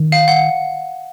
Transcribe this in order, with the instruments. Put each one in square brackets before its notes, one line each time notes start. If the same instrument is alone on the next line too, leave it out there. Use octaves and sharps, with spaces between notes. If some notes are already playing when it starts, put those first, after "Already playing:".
Already playing: [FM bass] D#3
[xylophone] F5
F#5